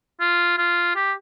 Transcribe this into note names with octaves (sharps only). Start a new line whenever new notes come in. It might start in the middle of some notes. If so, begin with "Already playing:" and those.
F4
F4
G4